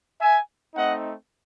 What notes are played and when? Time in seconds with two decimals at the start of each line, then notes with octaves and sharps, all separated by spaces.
0.21 E5 G#5
0.75 A3 C4 D#4 D#5 F#5